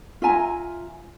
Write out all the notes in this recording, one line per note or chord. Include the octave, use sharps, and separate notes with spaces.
F4 E5 G#5 A#5